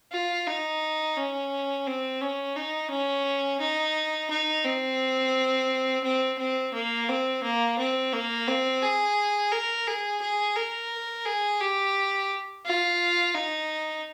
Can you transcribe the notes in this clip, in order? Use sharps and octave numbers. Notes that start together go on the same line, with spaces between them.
F4
D#4
C#4
C4
C#4
D#4
C#4
D#4
D#4
C4
C4
C4
A#3
C4
A#3
C4
A#3
C4
G#4
A#4
G#4
G#4
A#4
G#4
G4
F4
D#4